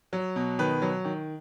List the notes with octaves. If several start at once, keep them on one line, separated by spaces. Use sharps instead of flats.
F#3
B2
D#3 B4
F#3
D#3